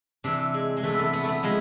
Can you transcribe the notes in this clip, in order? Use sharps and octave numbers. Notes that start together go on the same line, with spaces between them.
C3 E3 D4
G#3
G#3
C3 E3 A3
B3
A3
B3
A3 B3
F3 G#3